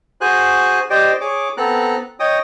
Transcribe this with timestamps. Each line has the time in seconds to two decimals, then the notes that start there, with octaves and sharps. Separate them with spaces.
0.21 F#4 G#4 C5 G#5 F#6
0.90 G4 C5 D5 D#5 G5
1.21 G#4 C#5 D6
1.57 B3 C4 A4 A#5 F#6
2.20 C#5 D#5 G5 D#6